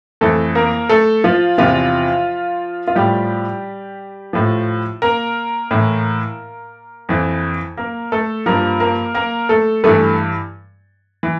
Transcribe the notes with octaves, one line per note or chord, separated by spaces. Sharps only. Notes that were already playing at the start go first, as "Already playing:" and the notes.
F2 E3 A3 A4
A#3 A#4
A3 A4
F3 F4
E2 C3 E3 F3 F4
F4
A2 F3 G3 G4
A2 F3
A#3 A#4
A2 E3
F2 E3
A#3 A#4
A3 A4
G2 F3 A#3 A#4
A#3 A#4
A#3 A#4
A3 A4
G2 E3 A3 A4
E3